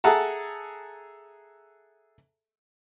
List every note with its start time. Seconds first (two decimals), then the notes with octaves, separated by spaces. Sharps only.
0.04 G#4 A4 E5 F#5 A5 A#5